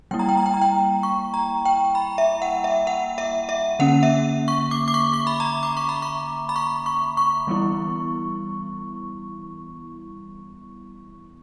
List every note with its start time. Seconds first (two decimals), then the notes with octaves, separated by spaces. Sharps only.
0.11 G3 A#3 E4 G5
0.19 A#5
0.29 G5
0.37 A#5
0.46 G5
0.54 A#5
0.62 G5
1.03 C#6
1.34 A#5
1.65 G5
1.95 B5
2.18 E5
2.42 F#5
2.64 E5
2.87 F#5
3.18 E5
3.49 E5
3.79 D3 A#3 C#4 F#5
4.03 E5
4.48 C#6
4.71 D6
4.88 D6
4.94 C#6
5.13 C#6
5.27 B5
5.40 A#5
5.63 D6
5.77 C#6
5.89 B5
6.02 C#6
6.49 B5
6.56 C#6
6.86 C#6
7.17 C#6
7.47 E3 G3 B3 E4